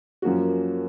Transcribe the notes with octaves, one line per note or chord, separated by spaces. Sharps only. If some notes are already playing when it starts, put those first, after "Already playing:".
F#2 F3 A#3 C#4 F#4